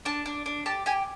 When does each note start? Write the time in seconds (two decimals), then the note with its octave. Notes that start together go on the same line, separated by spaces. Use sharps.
0.05 D4 A5
0.26 D4
0.46 D4
0.66 G4 A5
0.86 G4 G#5